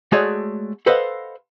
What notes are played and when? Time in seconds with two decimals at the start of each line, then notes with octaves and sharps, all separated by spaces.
0.12 G#3 A3 F#4 G#4 C#5 D5
0.86 A4 B4 C5 D#5 F5 F#5